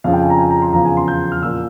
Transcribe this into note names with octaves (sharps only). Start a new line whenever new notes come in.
F2 C#3 F3 F5
G5
G#5
A#5
G#5
A#5
C6
E2 C#3 F3 A#5
G#5
C6
G6
F6
A#2 F3 E6